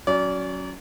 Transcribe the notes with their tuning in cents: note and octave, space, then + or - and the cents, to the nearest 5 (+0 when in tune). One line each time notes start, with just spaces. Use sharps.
F#3 +0 C#4 +0 D5 -30